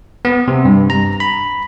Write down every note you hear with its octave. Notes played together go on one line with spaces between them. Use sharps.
B3
C3
G2
A#5
B5